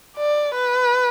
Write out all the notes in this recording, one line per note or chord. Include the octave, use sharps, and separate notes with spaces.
D5
B4